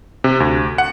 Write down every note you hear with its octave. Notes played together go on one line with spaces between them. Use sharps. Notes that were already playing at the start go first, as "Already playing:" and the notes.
C3
D2
F#5